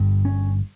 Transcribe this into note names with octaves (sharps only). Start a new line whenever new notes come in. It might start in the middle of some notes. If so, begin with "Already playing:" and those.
Already playing: G1 G2
C#4